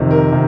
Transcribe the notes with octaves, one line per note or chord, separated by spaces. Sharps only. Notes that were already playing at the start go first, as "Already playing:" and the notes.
Already playing: F2 C3 D#3
A#4
C3 D#3